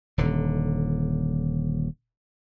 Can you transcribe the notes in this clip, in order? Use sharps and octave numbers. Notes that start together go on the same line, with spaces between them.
D#1 D3